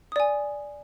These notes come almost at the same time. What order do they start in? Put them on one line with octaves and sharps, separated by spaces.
D#6 D5 G#5